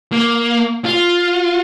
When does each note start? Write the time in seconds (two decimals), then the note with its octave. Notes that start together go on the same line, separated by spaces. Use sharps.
0.12 A#3
0.85 F4